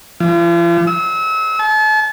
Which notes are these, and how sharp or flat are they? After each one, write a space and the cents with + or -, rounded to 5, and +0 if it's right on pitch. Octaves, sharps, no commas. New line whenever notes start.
F3 -45
E6 -35
A5 -40